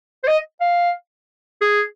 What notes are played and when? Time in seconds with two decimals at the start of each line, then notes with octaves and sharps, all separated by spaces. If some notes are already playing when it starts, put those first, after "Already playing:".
0.23 C5
0.27 D#5
0.61 F5
1.61 G#4